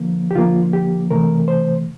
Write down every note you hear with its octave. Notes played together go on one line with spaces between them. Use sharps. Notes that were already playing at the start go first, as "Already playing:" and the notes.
Already playing: D3 F3 A#3
G4
D3 F3 A#3 F4
G4
C3 E3 A3 A#4
C5